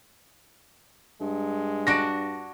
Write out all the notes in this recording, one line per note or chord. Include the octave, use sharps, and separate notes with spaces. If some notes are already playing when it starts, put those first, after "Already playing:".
G2 G#3
D4 F#4 A#6 D7